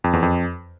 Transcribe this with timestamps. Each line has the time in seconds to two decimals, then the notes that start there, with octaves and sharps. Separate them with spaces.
0.04 F2
0.13 E2
0.23 F2